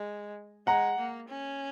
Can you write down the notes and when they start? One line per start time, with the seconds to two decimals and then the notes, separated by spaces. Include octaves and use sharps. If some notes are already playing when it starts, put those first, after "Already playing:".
Already playing: G#3
0.67 G#3 F#5 A#5
0.98 A#3
1.28 C#4